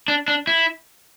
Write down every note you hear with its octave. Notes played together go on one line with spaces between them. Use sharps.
D4
D4
E4